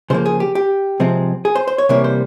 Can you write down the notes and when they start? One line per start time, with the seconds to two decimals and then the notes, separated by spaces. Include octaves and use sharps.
0.10 C#3 F3 A#3 C5
0.26 G#4
0.40 G4
0.55 G4
1.00 C3 F3 G#3 C4
1.45 G#4
1.55 C5
1.68 C5
1.78 C#5
1.89 C3 E3 G3 A#3 C#5
2.04 C5